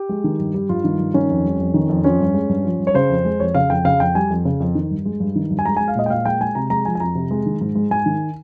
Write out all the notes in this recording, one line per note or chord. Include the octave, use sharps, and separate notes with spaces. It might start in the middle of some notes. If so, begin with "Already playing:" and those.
Already playing: G4
G#3
D#3
G2
G3
G2 F4
D#3
G2
D#3 C#4
F2
G3
F2
D#3
F2
F3 C#4
G2
G#3
G2
F3
G2
C#5
C#3 C5
F2
G#3
F2 C#5
C#3 F5
F2 G5
C#3 F5
F2 G5
G3 G#5
F2
C#3
F2
D#3
G2
G#3
G2
D#3
G2
G#5
G#3 A#5
G#3 G#5
F5
A#2 D#5
G5
A#2 F5
G#3 G5
G#3 G#5
C3 A#5
G#3 A#5
F3 G#5
G#5
F2 A#5
C3
G#3
D#3
G#2
G#3
G#2 G#5
D#3